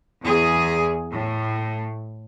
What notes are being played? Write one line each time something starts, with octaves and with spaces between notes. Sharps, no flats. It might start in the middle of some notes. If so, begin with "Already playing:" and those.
E2 G#4
A2